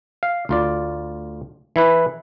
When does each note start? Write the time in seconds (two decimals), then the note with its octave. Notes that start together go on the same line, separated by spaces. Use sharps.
0.23 F5
0.49 D2 F4 D5
1.76 E3 E4 B4